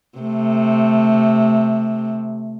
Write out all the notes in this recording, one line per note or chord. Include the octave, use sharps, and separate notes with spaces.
C3 A3